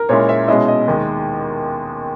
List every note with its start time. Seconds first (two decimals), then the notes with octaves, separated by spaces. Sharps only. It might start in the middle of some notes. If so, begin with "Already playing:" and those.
Already playing: A#4
0.09 A#2 G#3 C#4 E4 C#5
0.29 E5
0.48 B2 G#3 C#4 E4 D#5
0.68 D#5
0.88 D#2 D#3 G#3